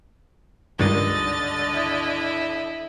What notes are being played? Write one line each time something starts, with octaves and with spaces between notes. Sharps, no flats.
C#2 G2 D3 D#3 D#5 A6
E4